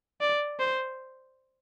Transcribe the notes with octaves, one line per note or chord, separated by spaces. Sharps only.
D5
C5